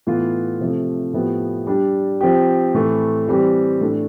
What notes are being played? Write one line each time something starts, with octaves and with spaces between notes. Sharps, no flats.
A2 E3 B3 F4
C3 F3 A3
A2 F3 B3 E4 G4
G3 D4 G4
F3 C4 G4
A2 E3 A3 C4
E3 G3 C4 G4
A2 E3 A3 D4